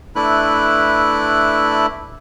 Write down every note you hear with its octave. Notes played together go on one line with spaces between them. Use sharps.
A3 D4 E4 B4 F#6